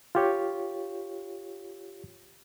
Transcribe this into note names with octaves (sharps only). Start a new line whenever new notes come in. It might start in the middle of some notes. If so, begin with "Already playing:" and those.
F4 G4 C#5